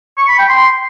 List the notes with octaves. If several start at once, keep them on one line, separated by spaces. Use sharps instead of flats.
C#6
B5
G5
C6